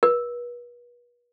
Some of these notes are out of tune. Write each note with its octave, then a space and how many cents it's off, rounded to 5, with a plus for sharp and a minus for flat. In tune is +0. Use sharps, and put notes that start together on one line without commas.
B4 -40